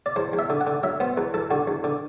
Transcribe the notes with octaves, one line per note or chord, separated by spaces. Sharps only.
D5
E2 C5
E2
E5
D3
F#5
D3
F#3 E5
B3 C5
E2 B4
E2 A4
D3 F#4
E2
D3